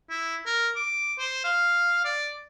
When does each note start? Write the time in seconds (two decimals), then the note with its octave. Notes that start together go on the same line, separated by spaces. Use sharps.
0.10 E4
0.46 A#4
0.76 D6
1.19 C5
1.44 F5
2.05 D5